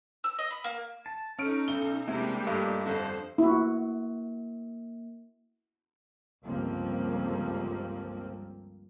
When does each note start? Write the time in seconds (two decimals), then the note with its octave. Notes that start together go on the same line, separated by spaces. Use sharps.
0.24 E6
0.38 D#5
0.51 B5
0.64 A#3
1.06 A5
1.39 C#4 D#4 A4 F6 D7
1.68 B1 G7
2.08 E2 C3 G3 G#3 A#3 D4 G4
2.47 G2 A#2 A3 D#5 D6
2.85 F2 D3 C5
3.38 A#3 E4 F#4
6.43 G1 C#2 G2 F3 A#3 C4